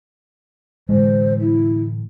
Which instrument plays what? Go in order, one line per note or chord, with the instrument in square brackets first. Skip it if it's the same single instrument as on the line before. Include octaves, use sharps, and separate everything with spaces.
[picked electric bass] A2 D3 E3 [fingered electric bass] G#3 [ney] C5
[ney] E4